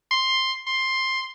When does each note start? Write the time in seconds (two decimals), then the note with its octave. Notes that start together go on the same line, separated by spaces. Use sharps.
0.11 C6
0.67 C6